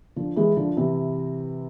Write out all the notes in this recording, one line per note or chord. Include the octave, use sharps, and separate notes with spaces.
D3 F3
E3 G#3
D3 F3
C3 E3